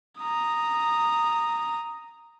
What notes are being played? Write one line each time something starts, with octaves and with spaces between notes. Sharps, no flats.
A#5 D#6